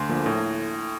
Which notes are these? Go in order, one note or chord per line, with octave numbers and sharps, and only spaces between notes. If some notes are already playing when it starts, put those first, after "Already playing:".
Already playing: D2 C6
D3 F3 A#3
A2